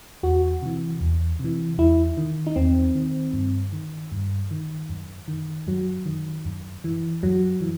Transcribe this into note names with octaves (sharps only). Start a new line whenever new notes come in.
E2 F#4
C3 E3
E2
C3 E3
E2 E4
D#3
D#4
E2 C4
D#3
G2
D#3
G2
D#3
F#2
D#3
F#2 F#3
D#3
F#2
E3
F#2 F#3
E3